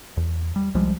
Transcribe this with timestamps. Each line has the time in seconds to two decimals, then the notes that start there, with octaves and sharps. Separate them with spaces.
0.17 E2
0.56 G3
0.75 C2 F3 G3 G#3